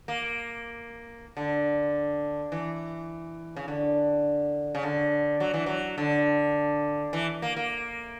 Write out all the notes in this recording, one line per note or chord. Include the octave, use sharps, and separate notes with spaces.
A#3
D3
E3
C#3
D3
C#3
D3
F#3
E3
F#3
D3
E3
A#3
A#3